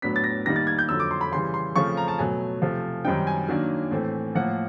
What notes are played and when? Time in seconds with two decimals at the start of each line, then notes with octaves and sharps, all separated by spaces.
0.02 A2 F#3 B3 D4 B6
0.16 A6
0.24 A#6
0.46 D#3 G3 A#3 D#4 A#6
0.56 A6
0.67 G#6
0.79 G6
0.89 F2 D3 F#3 E6
1.00 D6
1.11 C6
1.21 B5
1.32 C#3 E3 G3 C6
1.54 C6
1.76 C#3 F3 A3 C4 C#6
1.97 A#5
2.08 A5
2.18 B2 F#3 A3 G#5
2.62 C3 F3 A3
3.05 F#2 D#3 G3 C4 D#4 G5
3.27 G#5
3.49 D#3 F#3 A#3 D4
3.91 A2 E3 A3 C4
4.35 A2 F3 A#3 F#5